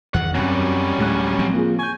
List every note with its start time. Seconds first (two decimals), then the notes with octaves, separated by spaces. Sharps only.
0.14 E2 D#3 F#5
0.34 F#2 F#3 G3 C4 C#4
0.99 D2 A2 G#3 A3 F#6
1.39 F3 C4
1.54 A#3 F4 G#4
1.79 G#5 C#6 G6